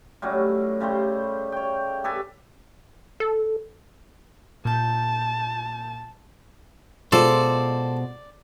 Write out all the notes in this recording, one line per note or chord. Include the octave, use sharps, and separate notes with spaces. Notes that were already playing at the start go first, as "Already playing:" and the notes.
A2 F#3 G3 C#4
C#3 G3 A3 C5
C#5 G5
G4 A4 B4 G#5
A4
A#2 A5 G6
B2 G#3 F4 A4 C5 D5